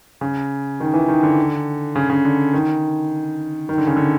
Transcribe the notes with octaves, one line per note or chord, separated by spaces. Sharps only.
C#3
D#3
E3
D#3
D3
C#3
C#3
D3
D#3
D#3
D3
C#3
D3